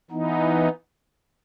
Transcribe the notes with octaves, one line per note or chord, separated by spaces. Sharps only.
E3 B3 D#4